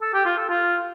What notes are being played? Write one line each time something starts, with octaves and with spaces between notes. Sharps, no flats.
A4
G4
F4
A4
F4